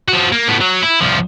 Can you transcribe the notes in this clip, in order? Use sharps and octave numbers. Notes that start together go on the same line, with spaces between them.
F3 F#4
A#3
A2 B3
F#3
E4
C2 F3